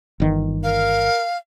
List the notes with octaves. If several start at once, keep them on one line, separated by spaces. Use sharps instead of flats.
G1 D#3 E3
A#4 F5